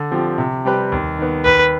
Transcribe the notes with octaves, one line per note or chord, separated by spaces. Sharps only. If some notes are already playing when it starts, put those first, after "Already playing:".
Already playing: D3
F3 C4 G4
C3
G3 C4 G4 B4
D#2
D#3 B3
D#2 B4